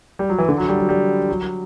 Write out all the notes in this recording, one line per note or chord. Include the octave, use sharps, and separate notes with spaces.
G3
F#3
E3
D3
F#3
G3
F#3
G3
F#3